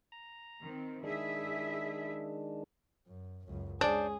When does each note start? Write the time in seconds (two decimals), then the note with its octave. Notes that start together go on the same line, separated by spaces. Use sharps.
0.12 A#5
0.61 D#3 C4
1.04 D#3 G#3 D4 E4 G#4 E5
3.07 F#2
3.45 C#2 F#2
3.81 G#3 C#4 D4 G#4 C5 D5